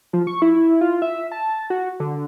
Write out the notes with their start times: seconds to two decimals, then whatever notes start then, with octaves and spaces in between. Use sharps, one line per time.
0.13 F3
0.27 C#6
0.42 E4
0.81 F4
1.02 E5
1.32 A5
1.70 F#4
2.00 D3